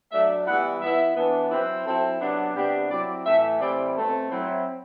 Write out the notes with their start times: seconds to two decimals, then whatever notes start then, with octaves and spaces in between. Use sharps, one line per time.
0.12 F#3 A3 D4 E5
0.46 E3 G3 B3 E4 F#5
0.81 E3 B3 E4 E5
1.16 E3 B3 D4
1.51 F#3 C4 E4 B4
1.86 F#3 C4 E4 A4
2.20 C3 F#3 B3 D4
2.55 C3 G3 B3 D4 G4
2.90 F#3 C4 E4 D5
3.25 A2 E3 A3 E5
3.60 A2 E3 G3 C4 E4 D5
3.95 B2 A3 C4 A4
4.30 F#3 C4 E4